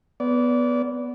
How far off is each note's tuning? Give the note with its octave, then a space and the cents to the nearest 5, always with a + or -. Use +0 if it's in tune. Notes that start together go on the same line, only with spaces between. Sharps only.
B3 +0 D5 -25